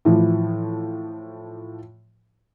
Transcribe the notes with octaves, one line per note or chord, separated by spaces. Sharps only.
A2 E3 F3